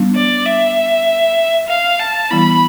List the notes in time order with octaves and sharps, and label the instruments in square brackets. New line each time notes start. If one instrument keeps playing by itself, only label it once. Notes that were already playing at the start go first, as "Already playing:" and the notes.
Already playing: [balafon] G3 B3 D4
[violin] D5
E5
F5
A5
[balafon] E3 G3 B3 E4 [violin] B5